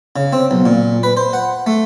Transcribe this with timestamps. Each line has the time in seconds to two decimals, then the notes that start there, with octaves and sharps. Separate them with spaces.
0.16 C#3
0.33 C4
0.51 B1
0.66 A#2
1.03 B4
1.17 C5
1.33 F#5
1.67 A3